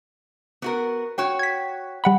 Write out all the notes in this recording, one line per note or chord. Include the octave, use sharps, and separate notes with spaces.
B3 F#4 A#4
F#4 C#5 G5
G#6 B6
G3 F#5 B5